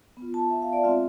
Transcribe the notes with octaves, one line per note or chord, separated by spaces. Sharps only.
B3
F4
A5
E5
F5
D5
G#3 C4 F4 E5